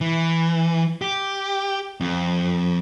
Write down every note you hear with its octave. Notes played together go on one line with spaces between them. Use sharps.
E3
G4
F2